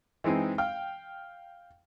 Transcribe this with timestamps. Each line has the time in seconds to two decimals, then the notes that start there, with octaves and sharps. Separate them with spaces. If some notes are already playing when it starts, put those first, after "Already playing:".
0.24 E3 G#3 C4 D#4 G#4
0.58 F5 G5 F6